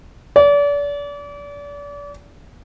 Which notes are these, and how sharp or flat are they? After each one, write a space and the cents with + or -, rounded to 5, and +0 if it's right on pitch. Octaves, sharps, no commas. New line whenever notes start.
D5 -35